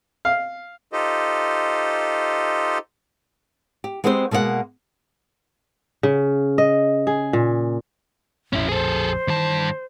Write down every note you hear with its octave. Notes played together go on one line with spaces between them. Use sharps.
F5
D#4 F4 G4 A4 C5 D#5
G4
G#3 B3 C4 G4 B4 C5
B2 G#3 A#3 C5 F#5
C#3
D#5
G#4
A#2
A#1 F2 A2 C#4 E4
G#4 A4 C5
G2 D#3 E3 A5